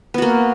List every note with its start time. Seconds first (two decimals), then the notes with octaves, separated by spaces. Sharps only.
0.14 B3
0.18 F#4
0.22 A#3